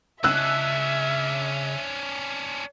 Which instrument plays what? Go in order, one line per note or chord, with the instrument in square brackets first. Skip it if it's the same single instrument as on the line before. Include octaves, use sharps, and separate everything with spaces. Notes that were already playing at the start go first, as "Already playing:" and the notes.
[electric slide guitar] C#3 D#5 [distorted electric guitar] C#4 D4 [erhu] E5 [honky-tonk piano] E6 F#6